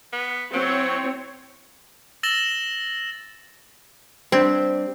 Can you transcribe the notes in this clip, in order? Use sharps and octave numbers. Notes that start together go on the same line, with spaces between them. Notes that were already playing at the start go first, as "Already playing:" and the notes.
B3
F#3 C4 E4 C#5
E6 A6 A#6 E7 F#7 G7
G3 C4 D4